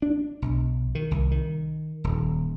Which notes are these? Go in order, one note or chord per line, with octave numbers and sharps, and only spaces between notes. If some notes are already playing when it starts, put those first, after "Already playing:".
D4
B1
D#3
C2
D#3
D#1